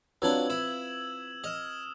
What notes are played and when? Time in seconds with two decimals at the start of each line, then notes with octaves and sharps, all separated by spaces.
0.22 F#3 C4 D4 F4 B4 E6 G#6 F#7
0.50 E4 E7
1.44 D#5 D#6 F6 E7